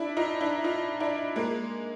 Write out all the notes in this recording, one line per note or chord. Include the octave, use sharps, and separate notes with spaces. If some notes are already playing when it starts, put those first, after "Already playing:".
Already playing: D4 E4
D#4 F4
D4 E4
D#4 F4
D4 E4
G#3 A#3